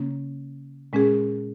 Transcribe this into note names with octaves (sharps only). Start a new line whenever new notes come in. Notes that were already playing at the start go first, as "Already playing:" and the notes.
Already playing: C#3 A#3 C#4
A#2 G#3 C#4 G#4